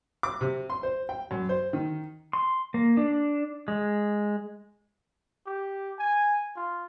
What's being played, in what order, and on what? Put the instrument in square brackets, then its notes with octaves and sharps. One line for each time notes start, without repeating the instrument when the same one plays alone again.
[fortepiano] D6
C3
C6
C5
G5
F#2
C5
D#3
[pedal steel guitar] C6
A#3
D4
G#3
[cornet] G4
G#5
F4